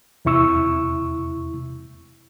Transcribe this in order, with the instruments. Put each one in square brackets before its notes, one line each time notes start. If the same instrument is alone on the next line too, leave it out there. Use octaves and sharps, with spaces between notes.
[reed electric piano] E2 C3 E4 C#6 E6